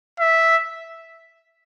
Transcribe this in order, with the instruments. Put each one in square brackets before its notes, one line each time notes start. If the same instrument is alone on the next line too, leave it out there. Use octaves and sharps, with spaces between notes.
[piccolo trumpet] E5